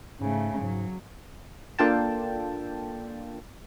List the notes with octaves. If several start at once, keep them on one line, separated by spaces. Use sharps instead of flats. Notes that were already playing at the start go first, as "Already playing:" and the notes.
G#2 C#3 A3
G#2 F#3
A#3 D4 F4 A4 G5 A5